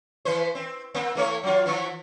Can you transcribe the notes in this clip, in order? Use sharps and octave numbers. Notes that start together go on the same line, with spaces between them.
E3 B4 C5
C4
A#3 C4
E3 A3 C#5
F#3 F4
E3 F3